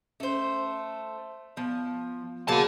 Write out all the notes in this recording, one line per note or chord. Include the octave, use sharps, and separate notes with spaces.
A3 C#4 C5
F3 B3
C#3 F3 F#3 A#3 F#4 F#5 A5